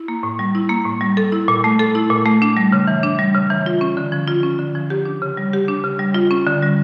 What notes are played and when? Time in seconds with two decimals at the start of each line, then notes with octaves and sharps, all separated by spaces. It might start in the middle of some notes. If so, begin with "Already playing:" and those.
Already playing: E4
0.08 A#3
0.23 A2
0.39 G3
0.55 E4
0.69 A#3
0.85 A2
1.01 G3
1.17 A4
1.32 E4
1.48 A#2
1.64 A3
1.79 A4
1.95 E4
2.10 A#2
2.25 A3
2.42 D4
2.57 G3
2.72 C#3
2.87 E3
3.03 D4
3.19 G3
3.35 C#3
3.50 E3
3.66 F4
3.81 C#4
3.97 D3
4.12 F3
4.28 F4
4.43 C#4
4.59 D3
4.75 F3
4.90 G4
5.05 D4
5.22 C#3
5.37 G3
5.53 G4
5.68 D4
5.84 C#3
5.99 G3
6.14 F4
6.31 C#4
6.47 D3
6.62 G3